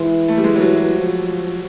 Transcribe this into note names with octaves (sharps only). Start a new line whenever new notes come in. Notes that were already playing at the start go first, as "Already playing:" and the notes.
Already playing: E3 G#3
A3
G3
G#3
F#3
G3
F#3
F3